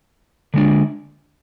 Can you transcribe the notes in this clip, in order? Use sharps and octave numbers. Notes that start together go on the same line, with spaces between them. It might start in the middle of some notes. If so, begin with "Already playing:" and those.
D3 G#3 D4